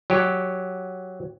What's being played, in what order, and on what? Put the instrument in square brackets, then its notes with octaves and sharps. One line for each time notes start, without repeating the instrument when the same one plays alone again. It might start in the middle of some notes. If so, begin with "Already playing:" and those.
[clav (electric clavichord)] F#3 G4